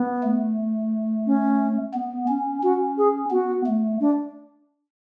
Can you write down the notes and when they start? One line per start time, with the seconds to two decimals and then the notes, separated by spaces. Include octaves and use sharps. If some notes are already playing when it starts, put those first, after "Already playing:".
Already playing: B3
0.23 A3
1.27 C#4
1.94 B3
2.28 C#4
2.63 C#4 F#4
2.98 G#4
3.31 B3 F#4
3.66 A3
4.00 D4